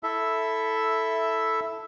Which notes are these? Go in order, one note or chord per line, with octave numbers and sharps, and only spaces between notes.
E4 A4 E5